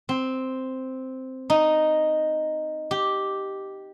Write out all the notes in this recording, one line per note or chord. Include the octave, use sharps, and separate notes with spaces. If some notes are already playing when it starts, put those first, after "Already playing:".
C4
D#4
G4